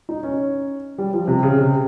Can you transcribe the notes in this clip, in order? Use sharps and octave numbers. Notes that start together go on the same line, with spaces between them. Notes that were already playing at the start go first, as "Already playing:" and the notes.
D#4
C#4
G3
F3
C3
C#3
C3